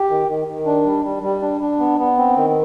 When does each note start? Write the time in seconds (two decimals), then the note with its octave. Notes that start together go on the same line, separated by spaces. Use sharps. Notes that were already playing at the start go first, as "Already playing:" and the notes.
Already playing: G4
0.10 D#3
0.28 D#3
0.48 D#3
0.66 D4
0.85 G3
1.04 G3
1.23 G3
1.42 D4
1.61 D4
1.80 B3
1.99 B3
2.18 C4
2.37 D#3